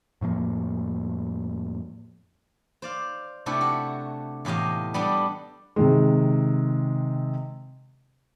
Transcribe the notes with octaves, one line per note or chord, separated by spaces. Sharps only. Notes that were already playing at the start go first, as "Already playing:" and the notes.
F2 A2 F3 A#3
C5 D5 F5
C3 A3 D4 E4 G4 A4
F#4
E2 A2 G4 D#5 F5
G3 B3 D4 A4 D#5
C3 D#3 G#3